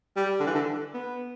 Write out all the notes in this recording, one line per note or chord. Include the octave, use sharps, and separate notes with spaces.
G3
D3
E3
D3
B3